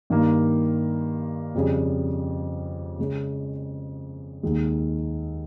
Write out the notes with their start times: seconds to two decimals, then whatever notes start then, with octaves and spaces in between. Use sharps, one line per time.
0.10 G2 D#3 A#3
1.54 F2 C#3 G3 C#4 G#4
2.99 C#3 G#3 C#4
4.43 D#2 D#3 G#3